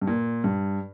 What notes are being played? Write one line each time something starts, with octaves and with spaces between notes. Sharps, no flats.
G2
A#2
G2